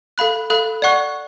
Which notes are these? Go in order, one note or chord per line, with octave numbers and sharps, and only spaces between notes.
A4 F5 B5 F#6
A4 F5 B5 F#6
D5 F#5 C#6 F#6